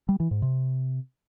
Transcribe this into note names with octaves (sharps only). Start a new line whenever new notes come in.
G3
E3
G#2
C3